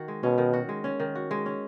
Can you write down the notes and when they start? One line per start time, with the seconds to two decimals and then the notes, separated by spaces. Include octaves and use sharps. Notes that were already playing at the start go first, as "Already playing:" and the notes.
Already playing: D#3 F#4
0.08 G#3
0.23 B2 C#4
0.38 D#3
0.53 F#4
0.69 G#3
0.84 C#4
1.00 D#3
1.15 F#4
1.31 G#3
1.46 C#4